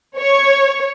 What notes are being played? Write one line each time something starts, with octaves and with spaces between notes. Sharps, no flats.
C#5